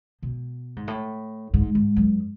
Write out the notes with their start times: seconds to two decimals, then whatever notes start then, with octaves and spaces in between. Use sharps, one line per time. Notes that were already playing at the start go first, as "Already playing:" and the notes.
0.22 B2
0.76 G#2
0.87 A2
1.54 G#2
1.75 G#2
1.96 F#2